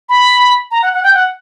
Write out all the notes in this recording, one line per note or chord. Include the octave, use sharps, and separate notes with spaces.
B5
A#5
F#5
F#5
G5
F#5